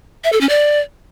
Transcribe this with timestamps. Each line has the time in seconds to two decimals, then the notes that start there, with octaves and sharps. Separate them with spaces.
0.24 E5
0.33 A4
0.41 C#4
0.49 D5